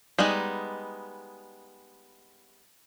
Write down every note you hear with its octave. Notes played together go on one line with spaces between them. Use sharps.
G3 G#3 B3 D#4